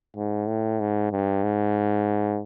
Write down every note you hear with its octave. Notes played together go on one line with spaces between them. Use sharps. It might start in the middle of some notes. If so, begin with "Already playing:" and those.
G#2
A2
G#2
G2
G#2